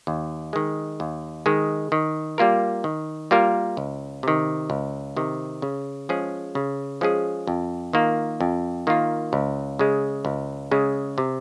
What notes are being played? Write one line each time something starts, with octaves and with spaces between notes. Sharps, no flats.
D#2
D#3 G#3
D#2
D#3 G#3
D#3
G3 A#3 F4 A#4
D#3
G3 A#3 F4 A#4
C#2
C3 D#3
C#2
C3 D#3
C#3
F3 G#3 C#4 G#4
C#3
F3 G#3 C#4 G#4
F2
D#3 A#3 F4
F2
D#3 A#3 F4
C#2
C#3 G#3
C#2
C#3 G#3
C3